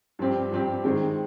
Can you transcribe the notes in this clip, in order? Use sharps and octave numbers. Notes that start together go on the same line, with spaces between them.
G2 F3 C4 G4
G2 F3 C4 G4
D#3 G#3 C4